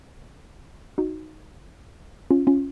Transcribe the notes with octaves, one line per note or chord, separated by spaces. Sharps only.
D#4 F#4
C#4 F4
C#4 F4